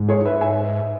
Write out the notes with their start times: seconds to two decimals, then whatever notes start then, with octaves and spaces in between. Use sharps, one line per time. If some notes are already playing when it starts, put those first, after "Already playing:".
Already playing: G#2
0.09 G#4 C#5
0.25 B4 E5
0.41 E5 G#5